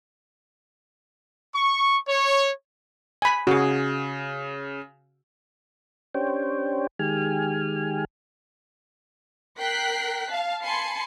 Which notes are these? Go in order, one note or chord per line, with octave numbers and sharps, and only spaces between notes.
C#6
C#5
G#5 B5
C#3 F#4 G#4
C#4 D4 G4 C5 C#5 G5
D#3 G#3 G4 G#5 F6
A#4 G5 F#6 B6 C7
F5 A5
G#5 A5 B5 C6 C7 C#7